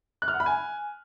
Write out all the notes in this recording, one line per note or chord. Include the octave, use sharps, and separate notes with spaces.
F#6
F6
F#5
B5
G#5